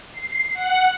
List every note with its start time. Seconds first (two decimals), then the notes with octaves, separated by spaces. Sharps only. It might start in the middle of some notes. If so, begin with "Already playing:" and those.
0.13 C7
0.53 F#5